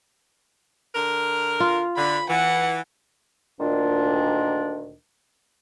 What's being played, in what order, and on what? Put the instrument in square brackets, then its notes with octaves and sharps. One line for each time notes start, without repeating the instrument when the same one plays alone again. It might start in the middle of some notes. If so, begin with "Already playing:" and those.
[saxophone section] D3 A#4
[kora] F4
[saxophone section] D3 [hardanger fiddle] B5
[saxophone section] E3 [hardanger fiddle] F#5
[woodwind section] D2 A#2 D#3 D4